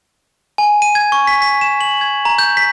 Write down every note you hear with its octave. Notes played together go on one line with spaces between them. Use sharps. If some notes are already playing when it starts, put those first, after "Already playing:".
G#5
D#7
G#6
C#6
B6
B6
E7
F#7
G#6
A#5
G6
B6